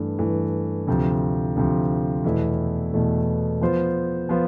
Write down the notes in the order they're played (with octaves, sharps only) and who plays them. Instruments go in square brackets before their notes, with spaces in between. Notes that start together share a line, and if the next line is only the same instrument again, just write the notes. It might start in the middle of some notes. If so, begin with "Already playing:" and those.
Already playing: [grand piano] G2 E3 A3
G2 E3 A3
D2 C3 F3
D2 C3 F3
E2 B2 A3 E4
E2 B2 A3 E4
F3 B3 F4 C5
F3 B3 F4 C5